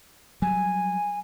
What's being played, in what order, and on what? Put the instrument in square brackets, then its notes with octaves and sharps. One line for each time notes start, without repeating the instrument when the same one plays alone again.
[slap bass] F#3 G3 [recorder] G#5